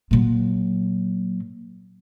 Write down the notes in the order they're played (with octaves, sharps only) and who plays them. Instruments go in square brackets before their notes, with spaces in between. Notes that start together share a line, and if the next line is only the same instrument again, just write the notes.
[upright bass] A#2 F#3